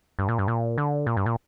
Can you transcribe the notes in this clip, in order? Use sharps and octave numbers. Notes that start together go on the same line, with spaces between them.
G2
A#2
G2
A#2
D3
A#2
G2
A#2